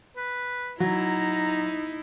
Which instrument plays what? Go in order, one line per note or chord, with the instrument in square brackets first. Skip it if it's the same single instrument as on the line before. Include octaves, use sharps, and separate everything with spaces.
[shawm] B4
[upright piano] F#3 [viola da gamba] D#4 E4 [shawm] A#5